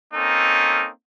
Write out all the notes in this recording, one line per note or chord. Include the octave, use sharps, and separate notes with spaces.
A#3 C4 C#4 D#4 A4